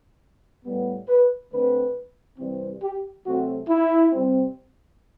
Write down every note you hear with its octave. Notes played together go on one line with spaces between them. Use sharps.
A2 G3 B3
B4
D3 A3 C4 B4
C3 E3 G3 C4
G4
C3 F#3 A3 C4 F#4
E4
C3 G3 C4